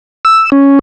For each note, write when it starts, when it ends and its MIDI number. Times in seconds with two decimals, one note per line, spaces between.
0.25 0.50 88
0.52 0.79 61